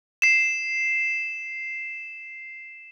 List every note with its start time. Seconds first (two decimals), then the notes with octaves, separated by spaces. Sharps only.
0.22 C7 E7